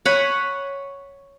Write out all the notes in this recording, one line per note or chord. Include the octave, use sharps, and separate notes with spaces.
C#5 F#5 G#5 B5